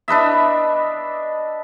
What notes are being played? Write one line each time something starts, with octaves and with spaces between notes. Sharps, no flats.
D4 B4 D#5 E5